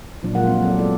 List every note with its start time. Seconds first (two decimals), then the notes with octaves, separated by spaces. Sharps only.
0.23 A#2 F3 F#3 D4
0.35 A#2 F#3 G#3 F4 A#4 F#5
0.47 C4
0.62 F#3 C4 A4 D5
0.78 G#3 B3 E4 A4 C#5 D5